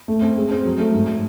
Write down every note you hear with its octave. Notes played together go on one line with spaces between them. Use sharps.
A3
C4
G#3
C4
F#3
A3
G#2